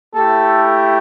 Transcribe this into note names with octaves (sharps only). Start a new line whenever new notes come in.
A3 E4 G4 A4